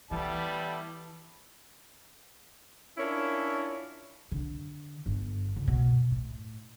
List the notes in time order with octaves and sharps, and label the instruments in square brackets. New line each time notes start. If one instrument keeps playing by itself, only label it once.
[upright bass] E3 [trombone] G3 [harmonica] B3 E4 A5
[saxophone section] C#4 D4 E4 F4 A#4 C#5
[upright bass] D3
G1
C#2
B2
A2